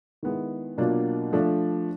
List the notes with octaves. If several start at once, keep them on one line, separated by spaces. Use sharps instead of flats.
D#3 G#3 B3 E4
B2 F#3 A#3 D4 F4
F3 A3 D4